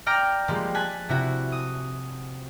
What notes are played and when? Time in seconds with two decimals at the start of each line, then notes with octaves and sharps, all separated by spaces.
0.06 D5 G5 A#5 F6 A#6 D7
0.48 F3 G3 G#3 A#3
0.75 G#5 A5 F#6 B6
1.09 C3 E4 F#4
1.52 D#6